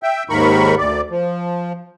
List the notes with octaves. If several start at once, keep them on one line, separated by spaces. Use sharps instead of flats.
E5 G5
D#2 G#2 D#3 A#4 B5 C#6
D2 D5
F3